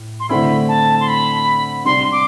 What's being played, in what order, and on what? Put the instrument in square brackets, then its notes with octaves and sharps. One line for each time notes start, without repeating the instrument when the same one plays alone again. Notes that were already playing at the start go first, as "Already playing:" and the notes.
Already playing: [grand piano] A2
[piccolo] C6
[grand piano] D3 A3 C4 E4 [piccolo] B5
[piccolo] A5
C6
B5
[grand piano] C3 G3 D4 [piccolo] C6
[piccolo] D6